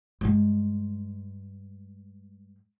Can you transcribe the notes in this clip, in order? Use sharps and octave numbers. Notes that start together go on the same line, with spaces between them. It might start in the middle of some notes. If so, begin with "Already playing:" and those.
G2 G#3